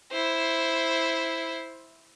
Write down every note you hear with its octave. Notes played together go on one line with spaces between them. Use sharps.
E4 C5